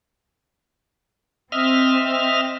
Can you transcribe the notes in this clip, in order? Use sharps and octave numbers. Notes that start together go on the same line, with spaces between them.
C4 D#5 E5 F6